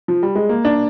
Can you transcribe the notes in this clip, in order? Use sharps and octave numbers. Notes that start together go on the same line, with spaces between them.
F3
G3
G#3
A#3
D4